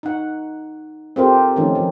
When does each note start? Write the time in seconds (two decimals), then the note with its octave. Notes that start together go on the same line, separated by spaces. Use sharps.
0.03 D#4 F#5
1.16 C4 F4 G4 A4 A#4 C5
1.56 D#3 F3 A3 C#4 D#4
1.75 F3